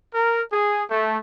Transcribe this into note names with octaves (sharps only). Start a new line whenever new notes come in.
A#4
G#4
A3